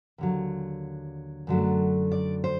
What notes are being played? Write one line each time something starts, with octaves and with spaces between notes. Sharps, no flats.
D#2 D3 F#3
F#2 D3 F#3 A3
D5
C5